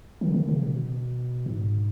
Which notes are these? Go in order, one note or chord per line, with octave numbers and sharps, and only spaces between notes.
D#3
C#3
D#3
C#3
B2
G#2